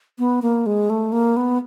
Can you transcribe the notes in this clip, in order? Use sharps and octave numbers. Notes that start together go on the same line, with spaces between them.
B3
A#3
G#3
A3
A#3
B3